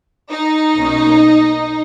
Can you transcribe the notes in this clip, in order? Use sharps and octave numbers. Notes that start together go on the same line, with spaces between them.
D#4
B1 B2 A#3 C#4